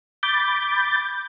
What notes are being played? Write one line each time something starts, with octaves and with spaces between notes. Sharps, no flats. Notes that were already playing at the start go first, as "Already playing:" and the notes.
B5 D6 G6 A6